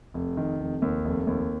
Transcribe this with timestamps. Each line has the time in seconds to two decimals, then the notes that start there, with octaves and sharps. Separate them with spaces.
0.14 F1
0.37 D#3
0.60 F1
0.82 D#2
1.05 F1
1.27 D#2